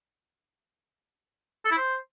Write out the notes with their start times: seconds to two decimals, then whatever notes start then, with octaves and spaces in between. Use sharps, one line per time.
1.65 A4
1.71 E4
1.77 C5